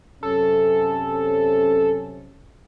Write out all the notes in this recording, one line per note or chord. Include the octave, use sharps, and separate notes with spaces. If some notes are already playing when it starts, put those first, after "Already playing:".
F#2 C3 C#4 A4